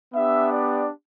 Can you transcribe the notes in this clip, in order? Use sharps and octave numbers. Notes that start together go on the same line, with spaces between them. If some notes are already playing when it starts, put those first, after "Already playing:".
B3 D4 G4 E5
D5